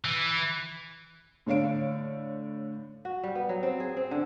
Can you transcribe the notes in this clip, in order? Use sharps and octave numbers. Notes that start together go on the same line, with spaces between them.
E3
A2 D3 C#5 F5 D7
F#4
G3
B3
F#3
C4
G#4
C4
D3